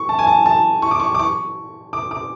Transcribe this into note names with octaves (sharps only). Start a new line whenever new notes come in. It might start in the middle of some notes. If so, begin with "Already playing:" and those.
Already playing: C#6
A5
G#5
A5
A5
C#6
D6
C#6
D6
C#6
D6
D6